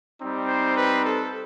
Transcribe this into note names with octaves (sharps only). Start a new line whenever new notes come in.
G3 C4 D#4
C5
B4
A4